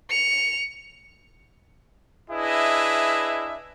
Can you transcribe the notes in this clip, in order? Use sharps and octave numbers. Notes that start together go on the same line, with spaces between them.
C#7 F7
D4 E4 G#4 B4 D#5 E5